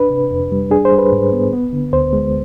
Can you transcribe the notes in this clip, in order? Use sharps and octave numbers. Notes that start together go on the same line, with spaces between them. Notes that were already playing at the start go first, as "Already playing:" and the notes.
Already playing: D4 B4
C3
F2
G3
D4 G#4
C5
G3
B4
G#2
B3
B3
D3
D2 C5
G#3